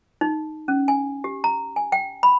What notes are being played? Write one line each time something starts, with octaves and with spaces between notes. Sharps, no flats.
D#4
C#4
G#5
G4
A#5
G#5
G5
B5